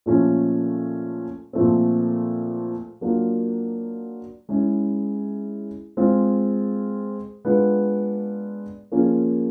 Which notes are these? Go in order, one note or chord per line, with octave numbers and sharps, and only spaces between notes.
A#2 F3 A3 C#4
A#2 F3 A3 C4
F#3 A#3 D4 F4
G#3 C#4 E4 G#4
G#3 C4 F4 G#4
G#3 B3 D4 F4
F3 A#3 C#4 F4 G#4